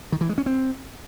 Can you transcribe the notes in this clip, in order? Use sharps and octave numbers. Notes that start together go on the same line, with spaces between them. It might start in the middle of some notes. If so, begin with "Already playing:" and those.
D#3
E3
G#3
C#4
C4